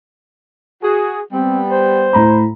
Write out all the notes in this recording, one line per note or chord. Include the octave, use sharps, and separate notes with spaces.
F#4 G#4
G3 B3 C4
C5
A2 A#5 B5